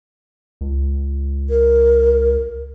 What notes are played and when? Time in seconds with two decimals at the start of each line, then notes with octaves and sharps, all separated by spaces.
0.61 C#2
1.49 A#4